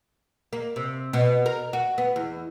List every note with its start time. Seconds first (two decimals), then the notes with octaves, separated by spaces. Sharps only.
0.53 A#3
0.76 C3
1.13 B2
1.46 A#4
1.73 F#4
1.98 B3
2.16 E2